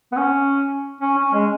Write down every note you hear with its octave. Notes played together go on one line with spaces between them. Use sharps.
B3
C#4
C#4
C#4
G#3